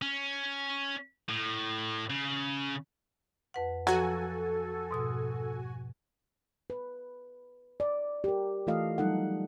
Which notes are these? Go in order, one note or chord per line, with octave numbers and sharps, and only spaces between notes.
C#4
A2
C#3
F2 B4 F#5
F3 F#3 F#4 A4 G#5
G#2 B2 D#6
B4
D5
G4 A#4
E3 A3 F4 A4 D#5 F5
F#3 G3 D#4 A4 F#5